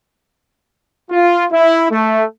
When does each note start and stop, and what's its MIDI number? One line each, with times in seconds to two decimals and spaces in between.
1.11 1.46 65
1.51 1.87 64
1.91 2.23 57